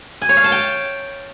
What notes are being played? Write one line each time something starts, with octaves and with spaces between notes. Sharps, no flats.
G#5
C#5
F5
A5
G5